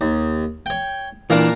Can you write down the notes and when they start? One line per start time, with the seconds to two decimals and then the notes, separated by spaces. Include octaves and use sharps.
0.01 D#2
0.66 C#5 G5
1.30 A#2 E3 D4 A#4 F5